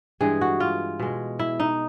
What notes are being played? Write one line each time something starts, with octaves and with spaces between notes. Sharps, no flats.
G2 E3 G#3 G#4
F#4
F4
B2 G#3
E4
D#4